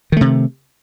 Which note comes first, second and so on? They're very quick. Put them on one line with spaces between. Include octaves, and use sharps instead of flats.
D#3 A3 C3